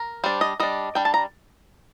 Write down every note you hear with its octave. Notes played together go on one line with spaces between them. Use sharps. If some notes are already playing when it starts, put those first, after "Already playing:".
Already playing: A#4
G3 D4 C5
D#5
G3 D4 D#5
G3 D4 G5
A5
A#5